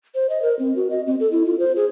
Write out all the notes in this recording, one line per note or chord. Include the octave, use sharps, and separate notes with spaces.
C5
D#5
A#4
C4
F#4
D#5
C4
A4
E4
F4
C5
G#4